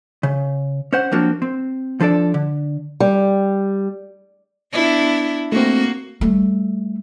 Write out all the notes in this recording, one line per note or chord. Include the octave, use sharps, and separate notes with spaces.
C#3
C#4 C5 F#5
F3 F#3 A#3 C4 D4 F#4
C4
F3 D4 A4 D5
D3
G3
B3 D4 E4
A3 A#3 C4 F#4
G3 A3